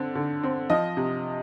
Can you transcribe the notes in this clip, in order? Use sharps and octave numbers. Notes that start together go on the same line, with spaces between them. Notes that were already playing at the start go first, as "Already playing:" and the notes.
Already playing: D3 C4
D3
C4
F3 D#5
C3